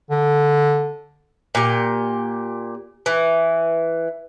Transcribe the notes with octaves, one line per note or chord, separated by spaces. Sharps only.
D3
A#2 G4
E3